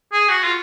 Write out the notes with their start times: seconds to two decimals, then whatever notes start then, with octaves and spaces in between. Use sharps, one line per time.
0.12 G#4
0.28 F#4
0.43 F4